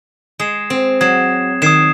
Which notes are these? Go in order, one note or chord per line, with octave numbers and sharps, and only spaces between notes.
G#3 D#6 G#6 C7 E7
C4
F#3 D#6 G#6 C7 E7
D#3 D#6 G#6 C7 E7